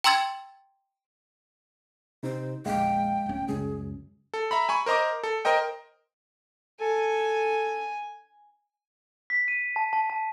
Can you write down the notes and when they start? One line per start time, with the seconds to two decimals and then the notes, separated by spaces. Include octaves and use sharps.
0.04 G5 A#5 C6 E6 G#6 A6
2.23 C3 D#4 C5
2.66 A#1 E2 G#3 F5 G5
3.26 D1 C#4
3.48 C#2 F#2 G3 G#4
4.34 A4
4.51 E5 A#5 B5
4.69 G#5 B5 C#6
4.86 A#4 C5 D#5 A#5 D6
5.23 A4
5.45 A#4 C5 D#5 G5
6.81 A4 G#5
9.30 B6
9.48 D#7
9.76 A5
9.93 A5
10.10 A5